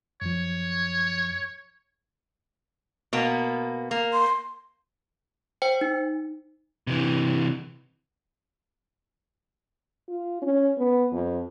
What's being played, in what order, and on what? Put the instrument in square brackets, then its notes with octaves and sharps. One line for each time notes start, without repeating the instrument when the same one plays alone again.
[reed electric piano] F#2 F3 [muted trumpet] C#5
[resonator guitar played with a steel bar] B2 A#3 B3
A#3
[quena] C6
[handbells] C5 G5 C#7
D#4
[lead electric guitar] C3 E3
[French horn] F4
C#4
B3
F2